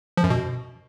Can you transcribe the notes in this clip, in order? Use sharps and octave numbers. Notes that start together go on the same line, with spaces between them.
F3
F#2
B2